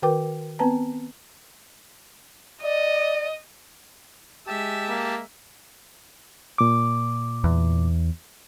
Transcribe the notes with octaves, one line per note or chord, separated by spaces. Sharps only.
D#3 F#4 A#4 B4 G5 D6
B3 C4 B4 A5 A#5
D5 D#5
G#3 G4 E5 A5
A#3
A#2 D6
E2